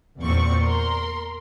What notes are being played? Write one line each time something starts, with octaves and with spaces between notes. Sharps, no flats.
E2 A#2 C4 D5 C#6
A#4 C6